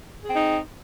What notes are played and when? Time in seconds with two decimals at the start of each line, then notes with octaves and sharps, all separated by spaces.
0.24 G#4
0.29 C4
0.34 D#4